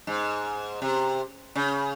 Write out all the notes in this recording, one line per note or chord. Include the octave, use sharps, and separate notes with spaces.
G#2
C3
C#3